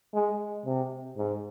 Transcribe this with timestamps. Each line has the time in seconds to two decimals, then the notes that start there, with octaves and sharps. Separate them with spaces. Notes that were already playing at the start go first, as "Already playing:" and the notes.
0.14 G#3
0.66 C3
1.17 G#2